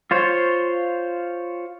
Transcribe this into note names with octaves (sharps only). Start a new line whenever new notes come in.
F4 C5 C#5